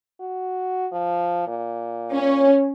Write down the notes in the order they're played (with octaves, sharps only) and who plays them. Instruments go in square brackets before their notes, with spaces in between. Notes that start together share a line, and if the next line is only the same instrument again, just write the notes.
[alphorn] F#4
F3
A#2
[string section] C#4